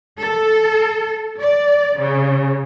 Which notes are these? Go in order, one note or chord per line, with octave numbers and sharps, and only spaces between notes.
A4
D5
C#3